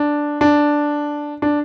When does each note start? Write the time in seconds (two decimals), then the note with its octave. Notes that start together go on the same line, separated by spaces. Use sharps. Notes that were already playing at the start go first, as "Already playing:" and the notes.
Already playing: D4
0.41 D4
1.42 D4